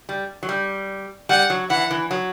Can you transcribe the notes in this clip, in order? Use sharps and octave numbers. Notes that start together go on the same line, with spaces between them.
G3
F#3
G3
G3 F#5
F#3
E3 F#5
E3
F#3